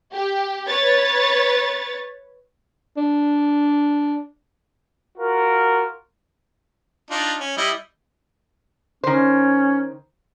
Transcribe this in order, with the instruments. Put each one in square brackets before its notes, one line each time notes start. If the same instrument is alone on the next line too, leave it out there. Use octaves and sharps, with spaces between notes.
[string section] G4
B4 C#5 A6
[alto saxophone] D4
[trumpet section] F4 F#4 A#4
[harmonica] D4 D#4 F4
C#4
G3 E4 D#5
[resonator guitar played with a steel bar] D#3 C5 [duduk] C#4